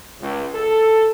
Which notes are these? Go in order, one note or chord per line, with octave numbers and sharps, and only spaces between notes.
C#2
A4